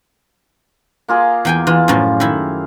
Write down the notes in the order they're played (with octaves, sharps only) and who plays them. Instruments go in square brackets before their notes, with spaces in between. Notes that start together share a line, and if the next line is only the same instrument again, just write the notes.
[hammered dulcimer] A#3 F4 G#4
[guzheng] E2 G5 G#5
[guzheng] E3 [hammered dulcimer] F4
[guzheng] F#2 A2 F3
D#3 E4